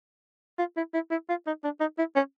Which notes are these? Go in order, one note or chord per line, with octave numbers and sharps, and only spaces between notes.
F4
E4
E4
E4
F4
D#4
D4
D#4
E4
C#4